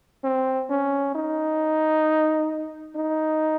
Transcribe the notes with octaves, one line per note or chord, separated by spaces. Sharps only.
C4
C#4
D#4
D#4